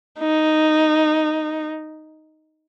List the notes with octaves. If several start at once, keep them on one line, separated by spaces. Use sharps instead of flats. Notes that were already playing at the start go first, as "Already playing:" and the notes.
D#4